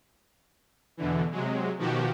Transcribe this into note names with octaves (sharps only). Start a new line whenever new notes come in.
E2 B2 D3 E3
C3 F#3 G#3
B2 D#3 F3 F#4 G4